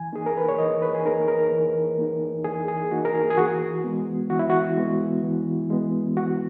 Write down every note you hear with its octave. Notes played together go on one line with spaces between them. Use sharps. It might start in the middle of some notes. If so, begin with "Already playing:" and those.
Already playing: E3 G#5
A#3 D#4 G#4
A#4
B4
C#5
E3 D#5
B4
G#4
A#3 D#4 A#4
A#4
E3
A#3 D#4
E3 G#4
G#4
A#3 D#4 F#4
A#4
G#4
G#4
E3 F#4
G#3 B3
E3 F#4
E4
F#4
G#3 B3
E3
G#3 B3
E3 F#4